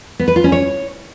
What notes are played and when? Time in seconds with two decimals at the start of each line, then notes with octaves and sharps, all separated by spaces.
0.19 B3
0.28 B4
0.36 F4
0.44 C#4
0.52 C#5